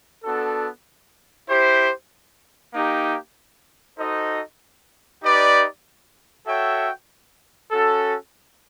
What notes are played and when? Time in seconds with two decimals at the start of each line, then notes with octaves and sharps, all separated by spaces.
0.24 B3 D4 F#4 A4
1.48 E4 G4 C5
2.73 A#3 D#4 G4
3.98 D#4 F#4 A4 C5 D#5
5.22 D#4 G4 B4 D5
6.46 F#4 A4 C#5 E5 G5
7.71 C#4 F#4 A4